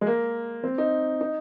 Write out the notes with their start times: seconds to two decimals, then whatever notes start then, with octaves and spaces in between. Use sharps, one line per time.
0.01 G#3
0.07 A#3
0.63 C4
0.78 D#4
1.21 D#4